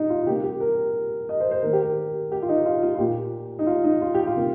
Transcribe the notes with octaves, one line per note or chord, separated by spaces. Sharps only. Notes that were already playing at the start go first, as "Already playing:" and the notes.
Already playing: A#2 D#4
F4
F4
C3 G3 A#3 G4
G4
A#4
D#5
C5
C5
D#3 A#3 A#4
G4
A#4
G4
F4
D#4
F4
F4
F4
A#2 A#3 G4
D#4
F4
D#4
F4
G4
F4
C3 G3 A#3